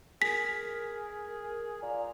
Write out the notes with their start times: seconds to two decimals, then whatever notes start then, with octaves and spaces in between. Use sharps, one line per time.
0.22 G#4 A#4 B6
1.82 A#2 A#5